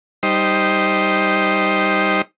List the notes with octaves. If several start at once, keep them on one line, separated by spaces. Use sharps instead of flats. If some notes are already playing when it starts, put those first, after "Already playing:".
G3 D#4 C5